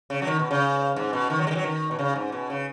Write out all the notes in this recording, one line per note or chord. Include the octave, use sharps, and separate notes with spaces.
C#3
F#3
D#3
B2
C#3
G#2
B2
D#3
F#3
G#3
D#3
F#3
D#3
B2
C#3
G#2
B2
C#3